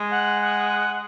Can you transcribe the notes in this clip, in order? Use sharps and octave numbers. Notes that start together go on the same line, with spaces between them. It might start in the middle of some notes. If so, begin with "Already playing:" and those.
Already playing: G#3
F#5
F#5